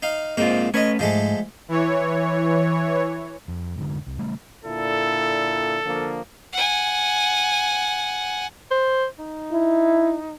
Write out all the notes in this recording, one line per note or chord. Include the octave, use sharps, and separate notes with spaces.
D#4 F5
G#2 A#3 C4 D#4 F4
A3 C#4 B4 C#5 D#5
E2 G#2 F3 G#3 A3
E3 C#5
F2
F1 G#2 D3
C2
C#3 G3 A3
A#2 D3 E4 A4
D3 F3 A#3
F#5 G#5
C5
D#4
E4